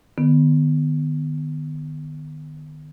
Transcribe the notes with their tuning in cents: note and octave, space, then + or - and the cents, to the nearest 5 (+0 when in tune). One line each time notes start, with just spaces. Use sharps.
D#3 -40 B3 +0